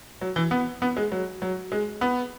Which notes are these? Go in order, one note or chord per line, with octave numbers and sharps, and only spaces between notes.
F#3
E3
B3
B3
G#3
F#3
F#3
G#3
B3